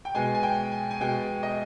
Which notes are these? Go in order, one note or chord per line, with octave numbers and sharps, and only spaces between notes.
G5
B2 G#3 G#5
G#5
G5
G#5
G#5
B2 G#3 G5
D#5